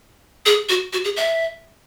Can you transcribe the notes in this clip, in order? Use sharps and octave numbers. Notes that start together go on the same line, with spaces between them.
G#4
F#4
F#4
G#4
E5